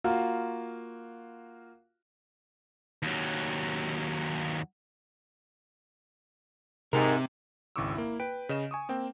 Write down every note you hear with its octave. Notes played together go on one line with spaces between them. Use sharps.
A#3 F4 F#4
D#2 F#3
G#2 C3 A#4
G#1 C#2 E4 C#6 D6 E6
A#3 E4
B4 G5 D7
C#3 D#5 E7
G#5 C#6 D#6
A#3 C4 G5